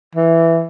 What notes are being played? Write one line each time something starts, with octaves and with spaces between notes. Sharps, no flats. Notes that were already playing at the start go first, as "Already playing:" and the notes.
E3